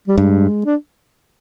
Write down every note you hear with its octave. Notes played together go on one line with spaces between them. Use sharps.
G3
G2 G#3
D4